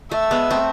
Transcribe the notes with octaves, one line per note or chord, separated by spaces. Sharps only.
A3 E5
G#3 B3
A3 C4